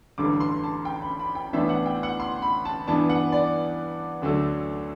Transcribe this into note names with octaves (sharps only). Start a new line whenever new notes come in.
A1 G2 D3 G3 D6
C6
A5
G5
B5
B5
G5
A1 A2 E3 B3 D4 E5
F#5
G5
F#5
C6
B5
A5
G2 E3 B3 D4 A5
F#5
D5
D2 D3 F#3 A3 D4